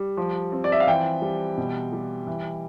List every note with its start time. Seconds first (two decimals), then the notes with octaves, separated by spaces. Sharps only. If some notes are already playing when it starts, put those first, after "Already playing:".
Already playing: G3
0.17 F3
0.52 C4
0.64 D5
0.72 E5
0.80 F5
0.87 E3 G5
1.22 G3
1.57 B2
1.93 G3
2.27 E3